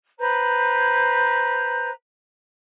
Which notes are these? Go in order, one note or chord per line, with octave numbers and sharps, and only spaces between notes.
B4 C5 A#5 G6